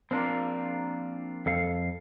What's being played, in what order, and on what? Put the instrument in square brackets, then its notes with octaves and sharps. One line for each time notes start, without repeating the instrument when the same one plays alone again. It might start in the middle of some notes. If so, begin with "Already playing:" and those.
[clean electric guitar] F3 A#3 A#4 [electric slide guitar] C4 D4 F4
[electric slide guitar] F2 A4 F5